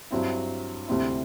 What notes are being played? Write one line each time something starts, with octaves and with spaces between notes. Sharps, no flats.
G2 F#3 C4 E4
D2 C3 G3 C4 E4